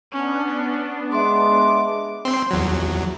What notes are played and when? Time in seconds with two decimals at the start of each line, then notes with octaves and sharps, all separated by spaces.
0.12 B3 C#4 D4
1.12 G#3 E5 C6 D6
2.25 C4 C6
2.51 E2 F#3